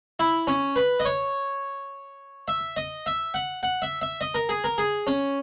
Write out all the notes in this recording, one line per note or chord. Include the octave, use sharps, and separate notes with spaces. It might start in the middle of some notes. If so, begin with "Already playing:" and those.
E4
C#4
B4
D#5
C#5
E5
D#5
E5
F#5
F#5
E5
E5
D#5
A#4
G#4
A#4
G#4
C#4